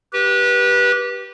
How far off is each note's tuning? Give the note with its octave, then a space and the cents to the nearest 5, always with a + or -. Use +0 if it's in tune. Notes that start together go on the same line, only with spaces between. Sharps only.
G4 -15 B4 -25